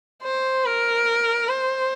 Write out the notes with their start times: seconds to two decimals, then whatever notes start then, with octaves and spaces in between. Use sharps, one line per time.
0.23 C5
0.65 A#4
1.48 C5